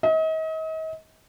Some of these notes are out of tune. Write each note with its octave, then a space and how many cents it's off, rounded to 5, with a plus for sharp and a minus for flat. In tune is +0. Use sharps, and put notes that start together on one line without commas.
D#5 +40